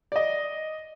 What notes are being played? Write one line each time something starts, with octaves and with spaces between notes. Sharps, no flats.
D5 D#5